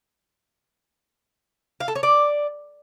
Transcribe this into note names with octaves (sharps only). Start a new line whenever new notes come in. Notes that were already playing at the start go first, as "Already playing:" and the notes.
F5
A4
C#5
D5